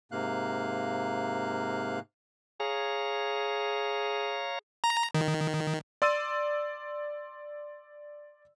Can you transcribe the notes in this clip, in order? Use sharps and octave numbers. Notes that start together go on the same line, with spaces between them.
G#2 C3 A#3 F5 F#6
G#4 C#5 F5 A#5
A#5
D#3
D5 C6 E6 A6 D#7